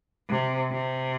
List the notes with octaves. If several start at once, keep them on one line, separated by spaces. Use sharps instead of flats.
C3
C3